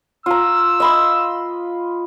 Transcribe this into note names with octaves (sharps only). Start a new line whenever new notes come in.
F4 A#5 E6
D#5 B5 C6